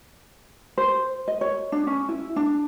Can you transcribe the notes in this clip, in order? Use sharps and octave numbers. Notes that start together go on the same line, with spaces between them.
C5
D#5
C#5
D4
C#4
E4
D4